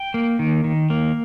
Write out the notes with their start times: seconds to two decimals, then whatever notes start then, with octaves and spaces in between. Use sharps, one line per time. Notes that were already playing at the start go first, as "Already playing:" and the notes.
Already playing: G5
0.14 A#3
0.39 D#3
0.64 D#3
0.90 A#3